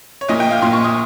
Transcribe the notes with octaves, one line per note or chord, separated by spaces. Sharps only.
C#5
A#1 A#2 D#5
G5
F5
A#1 A#2 C6
C#6
D#6